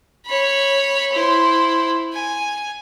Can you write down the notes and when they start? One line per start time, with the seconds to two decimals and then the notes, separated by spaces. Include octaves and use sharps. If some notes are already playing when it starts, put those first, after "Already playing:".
0.26 C#5 B5
1.12 E4 C5
2.13 G#5